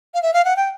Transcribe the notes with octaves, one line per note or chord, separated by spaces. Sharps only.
F5
E5
F5
F#5
G5